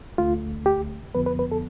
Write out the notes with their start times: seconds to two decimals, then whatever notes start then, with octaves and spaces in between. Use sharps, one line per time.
0.18 D2 D3 A3 F4
0.66 G4
1.15 F2 D3 F3 B3 B4
1.26 B4
1.39 B4
1.52 A4